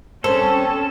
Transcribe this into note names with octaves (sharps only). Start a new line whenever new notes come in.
C4 C#4 A4 A5